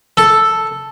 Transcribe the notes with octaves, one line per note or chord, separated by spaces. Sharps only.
A4